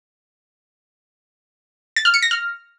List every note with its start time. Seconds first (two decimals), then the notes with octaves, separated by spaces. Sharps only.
1.96 A6
2.05 F6
2.14 C#7
2.22 A#6
2.31 F6